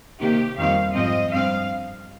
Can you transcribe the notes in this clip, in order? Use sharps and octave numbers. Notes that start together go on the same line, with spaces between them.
C3 D#3 A#3 G4
F2 D#3 G3 C4 F5
G#2 F3 C4 D#5
G2 G3 C4 F5